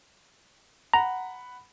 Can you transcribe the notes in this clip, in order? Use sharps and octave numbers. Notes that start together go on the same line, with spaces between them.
F#5 A#5 B5